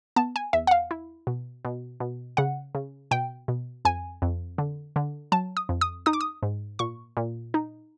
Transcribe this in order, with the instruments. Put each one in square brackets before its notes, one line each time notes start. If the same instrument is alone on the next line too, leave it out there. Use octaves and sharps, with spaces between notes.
[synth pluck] B3 A5
G#5
E2 E5
F#5
F5
E4
B2
B2
B2
C#3 F#5
C#3
B2 G5
B2
F2 G#5
F2
D3
D3
F#3 A5
D#6
F2
D#6
D#4 D#6
D6
D#6
G#2
A#2 C#6
A#2
D#4